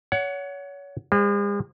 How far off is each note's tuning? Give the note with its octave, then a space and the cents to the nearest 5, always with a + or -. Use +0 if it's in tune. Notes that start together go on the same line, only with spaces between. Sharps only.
C#5 +30 F#5 +0
G#3 -45 C5 +5